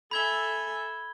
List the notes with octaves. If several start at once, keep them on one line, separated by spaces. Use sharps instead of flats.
A4 E5 G#5 B5 G#6 G7